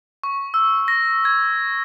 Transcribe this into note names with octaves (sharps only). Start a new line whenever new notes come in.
C#6
E6
A#6
G#6